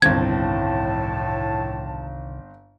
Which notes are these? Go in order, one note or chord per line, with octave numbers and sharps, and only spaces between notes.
G1 C2 A2 D#3 C4 A5 G#6